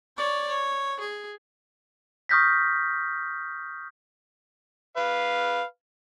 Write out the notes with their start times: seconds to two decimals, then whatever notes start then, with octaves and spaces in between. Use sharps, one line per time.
0.17 C#5 D5
0.48 C#5
1.00 G#4
2.29 C#6 D#6 F6 G6 A#6 B6
4.97 B4 F5